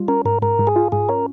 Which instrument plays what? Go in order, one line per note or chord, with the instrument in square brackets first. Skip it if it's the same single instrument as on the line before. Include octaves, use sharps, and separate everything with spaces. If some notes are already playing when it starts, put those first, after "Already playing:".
Already playing: [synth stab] G3 F4
[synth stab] C#4 [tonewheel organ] A#4
[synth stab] G#2 [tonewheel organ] A#4
[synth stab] G#2 [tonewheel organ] A#4
[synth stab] G#2
[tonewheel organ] G#4
[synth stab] F4
[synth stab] G#2 [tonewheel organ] G#4
[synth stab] C#4 [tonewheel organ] A#4